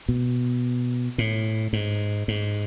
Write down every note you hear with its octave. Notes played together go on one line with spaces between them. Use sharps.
B2
A2
G#2
G#2